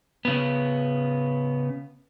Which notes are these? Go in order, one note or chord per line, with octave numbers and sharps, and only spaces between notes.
C#3 B3